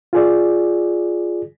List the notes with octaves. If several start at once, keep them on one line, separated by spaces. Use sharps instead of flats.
F4 G#4 D5